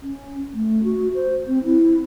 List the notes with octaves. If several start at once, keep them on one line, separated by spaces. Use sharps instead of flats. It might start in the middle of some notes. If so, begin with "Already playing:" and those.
C#4
A3
F#4
C5
C4
E4